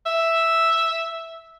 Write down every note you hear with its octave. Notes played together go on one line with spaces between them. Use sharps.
E5